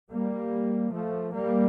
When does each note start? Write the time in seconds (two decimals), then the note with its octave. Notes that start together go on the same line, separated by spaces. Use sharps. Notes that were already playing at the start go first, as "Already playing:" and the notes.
0.11 G3 A#3
0.92 F3 A3
1.33 G3 A#3